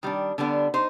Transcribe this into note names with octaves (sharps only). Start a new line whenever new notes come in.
D#3 G3 D4
D3 G3 B3 D4
D#4 C5